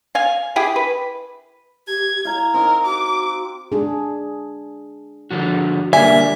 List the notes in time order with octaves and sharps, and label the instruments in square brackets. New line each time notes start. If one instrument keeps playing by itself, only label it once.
[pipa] F5 G#5
E4 G4 G#4
B4
[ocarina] G4 [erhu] G#6
[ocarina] E4 [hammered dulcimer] F5 A#5
[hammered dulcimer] C4 D#4 [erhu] A#4
[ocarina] F#4 [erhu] D6
[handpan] G#3 D4 G#4
[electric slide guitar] D3 F3 F#4
[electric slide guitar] D3 G3 A#3 [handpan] D5 [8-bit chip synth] E5 [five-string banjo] G#5